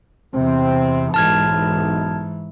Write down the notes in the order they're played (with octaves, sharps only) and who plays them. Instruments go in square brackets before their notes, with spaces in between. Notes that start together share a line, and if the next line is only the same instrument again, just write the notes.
[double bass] E2 C3 [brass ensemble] C4
[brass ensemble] B1 [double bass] G#2 E3 [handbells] A5 F6 G#6